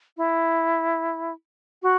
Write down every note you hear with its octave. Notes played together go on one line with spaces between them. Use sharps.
E4
F#4